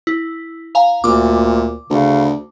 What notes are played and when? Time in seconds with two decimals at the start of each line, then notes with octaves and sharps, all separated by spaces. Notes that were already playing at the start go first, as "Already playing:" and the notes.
0.07 E4
0.75 F5 G#5 A#5
1.04 D2 A#2 D6
1.90 D2 C#3